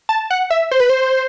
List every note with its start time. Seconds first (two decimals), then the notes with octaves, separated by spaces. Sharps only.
0.09 A5
0.30 F#5
0.50 E5
0.71 C5
0.80 B4
0.89 C5